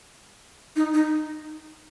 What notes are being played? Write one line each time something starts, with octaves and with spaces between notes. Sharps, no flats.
D#4
D#4